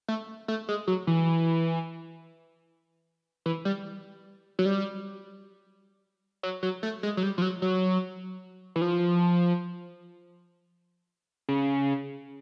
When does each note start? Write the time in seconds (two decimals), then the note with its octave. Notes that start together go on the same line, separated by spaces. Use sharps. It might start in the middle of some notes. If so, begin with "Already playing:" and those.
0.08 A3
0.48 A3
0.69 G#3
0.88 F#3
1.07 E3
3.46 E3
3.65 G3
4.59 F#3
4.65 G3
6.43 F#3
6.63 F#3
6.83 A3
7.03 G#3
7.17 F#3
7.23 G3
7.38 F3
7.42 F#3
7.62 F#3
8.76 E3
8.81 F3
11.49 C#3